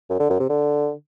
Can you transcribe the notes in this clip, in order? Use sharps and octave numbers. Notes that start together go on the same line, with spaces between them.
F#2
D3
F#2
C3
D3